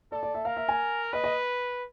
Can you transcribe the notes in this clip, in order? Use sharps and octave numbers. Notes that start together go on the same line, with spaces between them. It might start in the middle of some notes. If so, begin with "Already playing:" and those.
A4 D5
D5
E5
A#4 F5
E5
G#5
B4 D#5
D#5